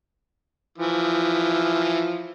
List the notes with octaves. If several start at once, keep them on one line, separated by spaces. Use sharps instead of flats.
E3 F3